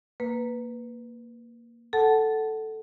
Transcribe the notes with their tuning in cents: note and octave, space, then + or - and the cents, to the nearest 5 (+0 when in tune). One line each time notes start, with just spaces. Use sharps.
A#3 +0 B4 +0
A4 +0 F#5 +15 A5 -10